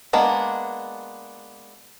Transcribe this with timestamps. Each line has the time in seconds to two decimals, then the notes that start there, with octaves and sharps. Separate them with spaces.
0.13 G#3 A#3 B3 D4